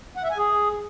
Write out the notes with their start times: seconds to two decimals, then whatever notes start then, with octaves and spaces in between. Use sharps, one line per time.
0.17 F#5
0.24 E5
0.31 G#5
0.38 G#4